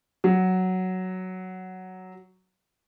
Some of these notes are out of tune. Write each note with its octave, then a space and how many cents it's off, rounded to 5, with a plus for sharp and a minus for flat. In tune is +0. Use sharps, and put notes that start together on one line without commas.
F#3 +5